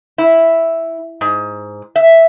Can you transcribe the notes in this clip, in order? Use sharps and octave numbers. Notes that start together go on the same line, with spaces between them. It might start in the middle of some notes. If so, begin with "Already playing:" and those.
E4
G#2
E5